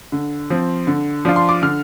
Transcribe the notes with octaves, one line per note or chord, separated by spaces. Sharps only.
D3
F3 C4
D3
F3 D4 F4
C6
D6
D3 F6